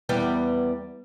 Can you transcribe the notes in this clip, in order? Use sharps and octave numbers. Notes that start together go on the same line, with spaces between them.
E2 G3 B3